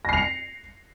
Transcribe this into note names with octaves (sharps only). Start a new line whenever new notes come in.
A#6 C7 C#7 F7